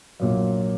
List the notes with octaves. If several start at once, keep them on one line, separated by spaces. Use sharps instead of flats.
A#1 A#2 F#3